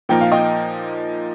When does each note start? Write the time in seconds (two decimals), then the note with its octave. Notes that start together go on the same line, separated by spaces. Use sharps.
0.09 A#2 F3 A#3 D#4 A#4 G5
0.21 F5
0.32 D#5 G5